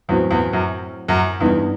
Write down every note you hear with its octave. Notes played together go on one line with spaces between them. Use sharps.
E2 A2 F#3 C4 F#4
E2
F#2
F#2
E2 G2 E3 B3 D#4